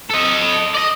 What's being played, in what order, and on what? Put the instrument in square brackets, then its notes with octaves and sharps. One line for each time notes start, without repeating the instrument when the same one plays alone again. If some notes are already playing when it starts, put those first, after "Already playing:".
[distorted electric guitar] A4 D#5
D5 D#5